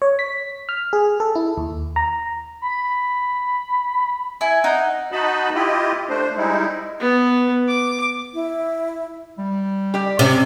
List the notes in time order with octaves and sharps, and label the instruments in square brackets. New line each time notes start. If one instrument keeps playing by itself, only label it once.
[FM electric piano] C#5
B6
F6
G#4
A4
E4
D#2
A#5
[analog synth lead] B5
[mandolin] E4 [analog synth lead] G#5
[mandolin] D#4 [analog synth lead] F#5
[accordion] D#4 F#4 D#5 A5 B5
E4 F4 G4 D#5
A3 D4 C5
G3 G#3 D#4 E4
[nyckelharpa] B3
D6
[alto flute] E4
[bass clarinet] G3
[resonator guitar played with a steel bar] G4 D5
[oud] C3 [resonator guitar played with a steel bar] C#4